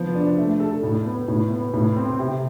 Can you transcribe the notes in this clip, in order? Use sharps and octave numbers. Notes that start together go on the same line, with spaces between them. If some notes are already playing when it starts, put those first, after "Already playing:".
Already playing: F3 B3
D4
A3
A4
A2
B3
A2
B3
A2
C4
C3